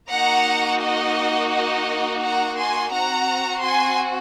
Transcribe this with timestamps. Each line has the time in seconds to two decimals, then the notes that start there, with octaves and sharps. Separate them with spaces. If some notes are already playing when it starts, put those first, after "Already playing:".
0.10 A#3 D#4 F#4 F#5 A#5
0.81 D#5 F#5
1.51 D#5 F#5
2.22 F#5 A#5
2.57 G#5 C6
2.93 C4 F#4 F#5 A#5
3.63 G#5 C6